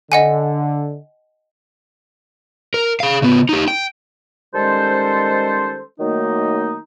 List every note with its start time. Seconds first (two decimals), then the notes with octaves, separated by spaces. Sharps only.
0.12 D3 D#5 F#5 G#5
2.74 A#4
3.00 G#4 F5
3.22 C#3 B3
3.49 D#4 G4
3.68 G5
4.54 D#3 G3 G#3 C#4 A4 C5
5.99 D#3 F#3 A3 A#3 D#4